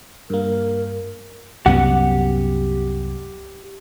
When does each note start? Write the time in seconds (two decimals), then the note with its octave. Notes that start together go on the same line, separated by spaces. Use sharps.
0.30 G2 A#3 A#4
1.66 C2 F#2 B3 G4 F#5